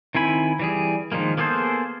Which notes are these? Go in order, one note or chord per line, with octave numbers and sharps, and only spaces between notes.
D#3 C4 E4 G#5 B5
E3 G3 G#4
D#3 F3 G#3 A#3
A#3 B3 G#4 A4 C5